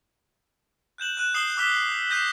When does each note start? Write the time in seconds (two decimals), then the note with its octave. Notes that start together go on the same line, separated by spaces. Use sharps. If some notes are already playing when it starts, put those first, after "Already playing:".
0.98 F#6 G6 E7 F#7
1.17 F#6 D#7 E7
1.34 D#6 C7 E7 F#7 G7
1.57 D6 E6 F6 B6 E7 G7
2.10 E6 G6 A#6 C7 D#7 E7